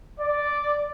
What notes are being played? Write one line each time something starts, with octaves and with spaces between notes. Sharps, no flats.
D5